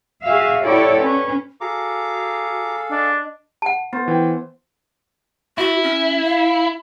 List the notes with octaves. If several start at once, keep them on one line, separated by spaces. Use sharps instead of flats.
F#4 G#4 E5 F5
E4 F#4 G4 A4 C#5 D5
C#4 B4
F#4 G#4 A4 F5 A#5 D6
D4 D#5
F#5 A5
B3 C5
E3 G5
E4 F#4
C#4
F5